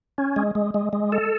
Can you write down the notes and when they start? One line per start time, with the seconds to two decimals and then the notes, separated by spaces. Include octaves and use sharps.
0.18 C#4
0.36 G#3
0.55 G#3
0.74 G#3
0.93 G#3
1.12 A4